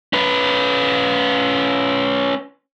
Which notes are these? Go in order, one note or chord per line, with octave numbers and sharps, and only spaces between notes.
C#4 B4